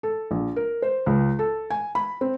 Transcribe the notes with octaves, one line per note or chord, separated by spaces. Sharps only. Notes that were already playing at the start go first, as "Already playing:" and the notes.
A4
A#1
A#4
C5
C#2
A4
G#5
B5
C4